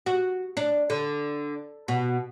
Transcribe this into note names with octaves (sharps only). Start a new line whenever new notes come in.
F#4
D4
D3
B2